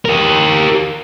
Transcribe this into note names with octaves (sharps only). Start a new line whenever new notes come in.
G4 A#4